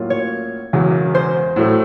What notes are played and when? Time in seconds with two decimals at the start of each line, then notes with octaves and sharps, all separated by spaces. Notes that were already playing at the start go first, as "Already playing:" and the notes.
Already playing: A2 F#3 A#3 C#4 F4
0.10 C#5
0.73 E1 E2 C#3 F#3
1.15 C5
1.56 A2 F#3 A3